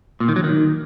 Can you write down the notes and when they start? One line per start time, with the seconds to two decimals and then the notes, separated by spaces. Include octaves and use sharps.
0.20 A#2
0.28 D#3
0.36 F#3
0.44 D#3